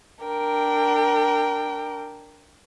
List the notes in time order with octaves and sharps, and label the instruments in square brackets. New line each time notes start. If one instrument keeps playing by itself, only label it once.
[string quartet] D4 A#4 G5